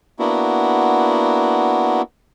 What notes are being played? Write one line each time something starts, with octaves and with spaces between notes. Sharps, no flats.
A#3 B3 D4 E4 F#4